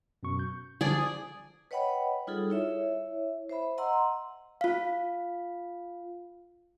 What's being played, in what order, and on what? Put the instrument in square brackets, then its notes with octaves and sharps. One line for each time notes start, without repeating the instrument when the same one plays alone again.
[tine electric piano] F#2 B2 C#6
G6
[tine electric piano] D3 F3 G3 [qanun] G#4 D5
[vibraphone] B4 C#5 D#5 F#5 G5 B5
G3 D#4 F4 G#4 A4
E4 C#5 E5
C5 E5 B5
D#5 F#5 A#5 C6 E6
[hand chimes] F4 F5